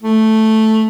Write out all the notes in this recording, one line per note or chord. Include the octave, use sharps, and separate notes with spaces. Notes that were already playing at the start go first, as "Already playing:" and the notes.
A3